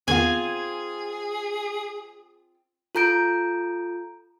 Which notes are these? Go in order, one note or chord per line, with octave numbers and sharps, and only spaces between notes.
E2 D#3 B3 C4 F4 G#4 G#5
F4 A4 A#5 G6 D7